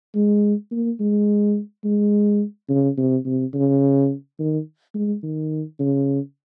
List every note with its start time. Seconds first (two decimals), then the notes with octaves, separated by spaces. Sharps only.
0.15 G#3
0.71 A#3
1.00 G#3
1.84 G#3
2.69 C#3
2.98 C3
3.25 C3
3.54 C#3
4.39 D#3
4.95 G#3
5.23 D#3
5.80 C#3